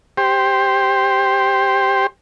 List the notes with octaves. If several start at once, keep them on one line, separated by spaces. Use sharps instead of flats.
G4 C5